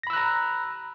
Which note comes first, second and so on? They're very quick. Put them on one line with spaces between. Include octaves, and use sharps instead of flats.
A#6 B5 E6 F#6 A#5